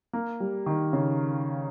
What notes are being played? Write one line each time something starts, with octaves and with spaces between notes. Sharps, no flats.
A#3
G3
D#3
C#3